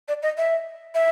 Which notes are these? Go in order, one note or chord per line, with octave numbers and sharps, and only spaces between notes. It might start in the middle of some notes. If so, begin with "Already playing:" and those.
D5
D#5
E5
E5